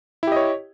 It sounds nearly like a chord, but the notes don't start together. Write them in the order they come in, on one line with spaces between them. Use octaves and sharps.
E4 G4 D#5 C#5